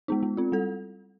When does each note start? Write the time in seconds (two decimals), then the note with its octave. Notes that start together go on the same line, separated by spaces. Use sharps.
0.08 G#3 B3 D#4
0.23 G#3
0.37 C4 F4
0.52 G3 A4